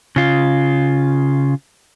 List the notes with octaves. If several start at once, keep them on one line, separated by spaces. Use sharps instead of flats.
C#3 F4